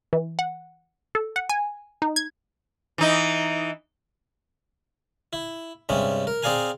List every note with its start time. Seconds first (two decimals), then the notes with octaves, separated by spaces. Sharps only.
0.13 E3
0.39 F#5
1.15 A4
1.36 F#5
1.49 G#5
2.02 D#4
2.16 G#6
2.98 E3 D#4
5.33 E4
5.89 G2 C3 G#3 C#4
6.27 A#4
6.43 C4 G#4 D5 F5 G#5 A#5